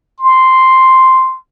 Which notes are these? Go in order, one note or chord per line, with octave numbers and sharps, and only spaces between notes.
C6